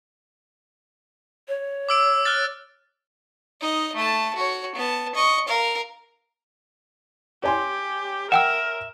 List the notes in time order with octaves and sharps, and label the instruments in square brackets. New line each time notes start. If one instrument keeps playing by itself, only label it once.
[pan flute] C#5
[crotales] D6 E6 D7
F6 F#6 A6
[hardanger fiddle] D#4 D#5
A3 A5
F#4 C#5
B3 A5
D#5 C#6
A#4 F5
[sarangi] G4 [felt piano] C#5 G#5 C6
[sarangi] A#4 [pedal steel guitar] E5 [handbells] F#5 G5 E6